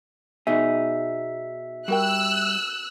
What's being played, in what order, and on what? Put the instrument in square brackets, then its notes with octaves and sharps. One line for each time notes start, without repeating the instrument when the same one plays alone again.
[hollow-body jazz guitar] B2 D#4 G#4 [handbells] E5
[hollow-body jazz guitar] G3 [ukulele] F#4 A#4 G5 [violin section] E6 F#6